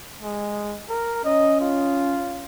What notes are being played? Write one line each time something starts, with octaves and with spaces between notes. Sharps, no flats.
G#3
A#4
C#4 D#5
F4